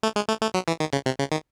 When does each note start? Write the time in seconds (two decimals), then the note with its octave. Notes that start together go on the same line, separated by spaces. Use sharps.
0.03 A3
0.16 G#3
0.28 A3
0.42 A3
0.54 F#3
0.68 E3
0.80 D#3
0.93 C#3
1.06 C3
1.19 C#3
1.32 D#3